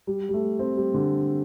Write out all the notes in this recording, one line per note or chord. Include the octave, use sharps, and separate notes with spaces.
G3
G3
A3
C4
G3
D3